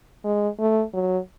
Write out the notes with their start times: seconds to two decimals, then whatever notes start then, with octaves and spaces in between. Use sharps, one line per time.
0.24 G#3
0.59 A3
0.94 F#3